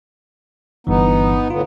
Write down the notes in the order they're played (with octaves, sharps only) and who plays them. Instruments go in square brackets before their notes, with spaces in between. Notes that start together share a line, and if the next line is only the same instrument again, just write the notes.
[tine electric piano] G1 G2 E3 [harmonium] B3 D#4
[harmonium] A2 D3 B3 [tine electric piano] F4